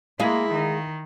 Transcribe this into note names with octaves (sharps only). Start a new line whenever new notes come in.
G#3 A#3 E4 G#4 F5
D#3